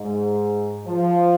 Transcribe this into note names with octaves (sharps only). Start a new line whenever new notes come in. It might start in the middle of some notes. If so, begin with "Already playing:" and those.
Already playing: G#2
F3